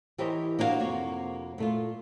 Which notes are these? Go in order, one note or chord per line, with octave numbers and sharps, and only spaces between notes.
E3 G4 A#4 C5 C#5 D#5
A#3 D4 E4 F#4 F5
F2 C3 A#3 F#4 C#5
A#2 A3 F4